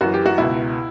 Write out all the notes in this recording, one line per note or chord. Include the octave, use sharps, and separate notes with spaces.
F#2 E3 F#4
G4
F#4
C#2 B2 E4